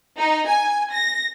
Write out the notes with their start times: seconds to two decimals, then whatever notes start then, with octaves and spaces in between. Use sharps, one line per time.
0.18 D#4
0.47 G#5
0.93 A#6